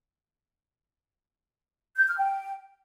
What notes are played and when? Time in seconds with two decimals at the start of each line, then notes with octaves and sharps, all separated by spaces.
1.97 G6
2.08 F6
2.18 G5